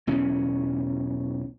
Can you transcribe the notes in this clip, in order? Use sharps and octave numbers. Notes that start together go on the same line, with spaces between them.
B1 E2 C#3 C#4